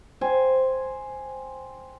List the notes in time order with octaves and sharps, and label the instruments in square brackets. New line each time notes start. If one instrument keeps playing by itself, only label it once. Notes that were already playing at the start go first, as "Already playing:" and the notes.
[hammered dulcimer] C5 G5 G#5